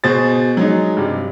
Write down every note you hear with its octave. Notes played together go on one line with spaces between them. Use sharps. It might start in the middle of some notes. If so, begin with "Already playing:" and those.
B2 G#4 C5 A6
F#3 G#3 D#4
G2 C3